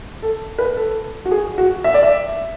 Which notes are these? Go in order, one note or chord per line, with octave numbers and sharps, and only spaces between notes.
A4
B4
A4
F#4
G#4
F#4
E5
D5
E5